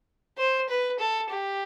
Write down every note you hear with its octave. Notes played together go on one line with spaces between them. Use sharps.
C5
B4
A4
G4